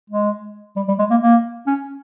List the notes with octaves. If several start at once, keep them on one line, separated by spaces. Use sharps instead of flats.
G#3
G3
G3
G#3
A#3
A#3
C#4